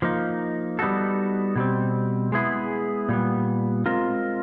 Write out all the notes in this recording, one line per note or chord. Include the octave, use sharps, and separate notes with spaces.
F3 A#3 D#4
G3 B3 D#4 F#4 A4
B2 G3 C4
G#3 B3 E4 G#4
A#2 G3 B3
G#3 C4 F4 A#4